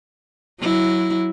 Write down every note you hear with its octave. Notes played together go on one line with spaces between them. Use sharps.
F#3 E4